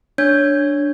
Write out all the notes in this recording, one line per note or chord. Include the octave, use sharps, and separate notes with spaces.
D4 C#5 G6 G#6